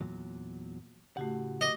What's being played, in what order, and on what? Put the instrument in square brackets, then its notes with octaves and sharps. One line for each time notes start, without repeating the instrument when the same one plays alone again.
[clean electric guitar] E2 A#2 F#3
[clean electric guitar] A2 C#3 F#5 [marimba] A3 F#4 G4
[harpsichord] D#5 [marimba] D6